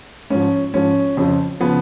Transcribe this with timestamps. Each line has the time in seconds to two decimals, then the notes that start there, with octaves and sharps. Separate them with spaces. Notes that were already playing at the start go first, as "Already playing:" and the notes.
0.30 G#2 F3 C#4
0.74 G#2 F3 C#4
1.17 F2 C#3 F3
1.60 C#3 F3 B3